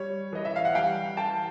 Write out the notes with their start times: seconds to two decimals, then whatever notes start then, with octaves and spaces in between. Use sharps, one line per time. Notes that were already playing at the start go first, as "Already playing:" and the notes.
Already playing: G3 C#5
0.33 E3 D#5
0.45 E5
0.56 F5
0.65 F#5
0.75 G3 F5 G5
1.17 E3 G5 A5